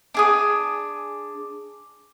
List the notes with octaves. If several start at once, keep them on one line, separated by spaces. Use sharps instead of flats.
D4 G#4 D#6